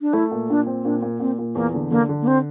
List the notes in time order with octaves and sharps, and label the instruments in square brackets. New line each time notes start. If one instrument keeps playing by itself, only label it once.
[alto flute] D4
[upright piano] A3 [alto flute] E4
[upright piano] A#2
[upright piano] A#2 [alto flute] D4
[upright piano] C4
[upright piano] A#2 [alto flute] D4
[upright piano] A#2
[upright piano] A#2 [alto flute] C4
[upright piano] A#2
[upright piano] E2 [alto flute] A#3
[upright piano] D3
[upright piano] D3 [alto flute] A#3
[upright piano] D3
[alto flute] A#3
C4